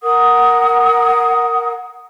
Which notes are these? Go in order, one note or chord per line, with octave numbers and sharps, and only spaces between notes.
A#4 F#5 D#6